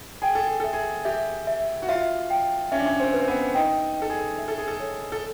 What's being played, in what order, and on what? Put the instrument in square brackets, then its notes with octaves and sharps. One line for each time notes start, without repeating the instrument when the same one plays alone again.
[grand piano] G#4 [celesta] G5
[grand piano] A4
G#4
[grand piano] A4 [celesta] E5
[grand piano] G#4
[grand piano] G4 [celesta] E5
[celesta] E5
[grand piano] F#4
[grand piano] F4 [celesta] E5
[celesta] G5
[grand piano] C#4 [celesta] E5
[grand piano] D4
C#4
C4
[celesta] B4
[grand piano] C4
B3
[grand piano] D#4 [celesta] G5
[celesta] G5
[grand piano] A4
G#4
[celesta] E5
[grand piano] A4
G#4
A4
[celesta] C#5
[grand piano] A4